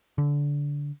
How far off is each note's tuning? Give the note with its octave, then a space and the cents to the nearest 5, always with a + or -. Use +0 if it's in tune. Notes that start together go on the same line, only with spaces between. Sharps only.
D3 -20